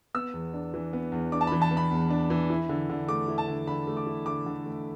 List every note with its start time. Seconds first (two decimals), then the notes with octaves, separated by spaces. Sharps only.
0.14 B3 E6
0.34 E2
0.54 D4
0.74 E3
0.93 B3
1.12 E2
1.32 D4 D6
1.41 A5
1.47 E3 B5
1.61 A5
1.71 B3
1.77 B5
1.91 E2
2.10 D4
2.30 E3
2.50 E4
2.69 D3
2.89 D3
3.08 A3 D6
3.28 E4
3.38 A5
3.48 D3
3.67 D3 B5
3.87 A3
3.97 D6
4.07 E4
4.26 D3 D6
4.46 D3
4.66 A3